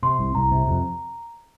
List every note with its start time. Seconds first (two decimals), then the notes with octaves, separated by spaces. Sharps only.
0.03 C3 C6
0.19 C2
0.35 C2 A#5
0.51 C3
0.68 F2